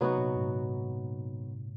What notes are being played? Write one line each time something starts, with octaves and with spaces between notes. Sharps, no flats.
C3 F#3 B3 D#4 F#4
A#2
G#2